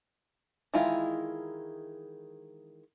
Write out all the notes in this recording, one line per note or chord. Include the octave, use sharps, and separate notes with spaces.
D#3 E3 G#3 E4 F4